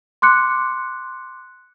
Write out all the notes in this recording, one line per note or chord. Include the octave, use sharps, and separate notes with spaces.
C6 D6 F#6 C#7